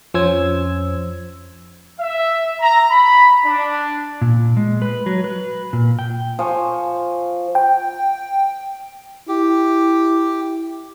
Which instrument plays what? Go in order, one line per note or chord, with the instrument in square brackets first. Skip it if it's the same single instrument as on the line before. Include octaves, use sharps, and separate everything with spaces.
[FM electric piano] F2 F3 C#4 C5 E6 G#6
[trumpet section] E5
A#5
B5
D4
[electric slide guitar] A#2
G#3
B4
F#3
B4
A#2
G5
[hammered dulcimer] F3 G#5 C#6
[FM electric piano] G5
[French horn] E4 [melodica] G4